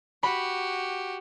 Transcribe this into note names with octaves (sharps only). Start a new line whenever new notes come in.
F#4 G4 B5